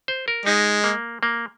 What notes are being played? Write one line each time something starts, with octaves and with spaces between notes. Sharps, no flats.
C5
A#4
G#3 D#4
A#3
A#3